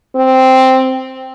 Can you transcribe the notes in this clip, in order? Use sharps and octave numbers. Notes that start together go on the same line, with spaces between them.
C4